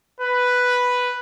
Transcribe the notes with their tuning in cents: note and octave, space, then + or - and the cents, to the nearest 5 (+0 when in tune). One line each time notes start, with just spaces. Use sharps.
B4 +0